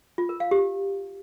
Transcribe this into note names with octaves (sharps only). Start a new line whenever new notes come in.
F4
A#4
F5
G4